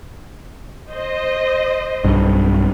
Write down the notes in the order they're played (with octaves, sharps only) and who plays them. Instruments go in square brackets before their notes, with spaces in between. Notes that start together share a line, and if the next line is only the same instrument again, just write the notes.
[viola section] C5 D#5
[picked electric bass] B1 G2